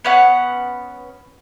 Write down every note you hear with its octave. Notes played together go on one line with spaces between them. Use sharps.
B3 C#4 F#5